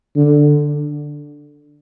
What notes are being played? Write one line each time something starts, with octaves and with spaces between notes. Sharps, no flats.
D3